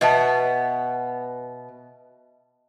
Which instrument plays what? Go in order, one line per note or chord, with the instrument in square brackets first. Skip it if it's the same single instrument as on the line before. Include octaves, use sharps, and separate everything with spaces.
[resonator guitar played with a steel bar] B2 B3 [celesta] D#5 E5 A5